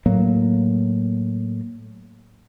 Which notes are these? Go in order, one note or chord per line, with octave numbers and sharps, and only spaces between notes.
A2 F#3 A#3